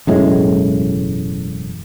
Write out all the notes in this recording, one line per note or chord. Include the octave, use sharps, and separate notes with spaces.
E1 F#2 A2 G#3